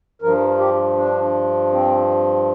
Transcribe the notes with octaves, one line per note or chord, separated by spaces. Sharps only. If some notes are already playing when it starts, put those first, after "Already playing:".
G2 F3 A#4
G4
D4
C4